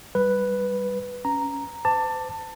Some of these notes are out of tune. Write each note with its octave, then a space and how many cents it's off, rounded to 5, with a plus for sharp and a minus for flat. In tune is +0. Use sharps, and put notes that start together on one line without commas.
G3 -5 B4 +0
C#4 +5 A#5 +0
C5 -45 A5 +20 D6 +0